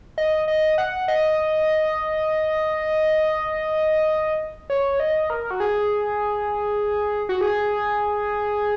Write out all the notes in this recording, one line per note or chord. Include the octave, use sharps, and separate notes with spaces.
D#5
D#5
F#5
D#5
C#5
D#5
A#4
F#4
G#4
F#4
G#4